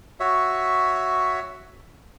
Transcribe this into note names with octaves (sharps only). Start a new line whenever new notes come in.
F#4 C#5 E5